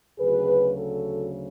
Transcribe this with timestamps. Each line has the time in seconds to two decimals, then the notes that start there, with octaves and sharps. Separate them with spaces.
0.19 D2 C#3 F#3 G#4 B4
0.76 F#4 A4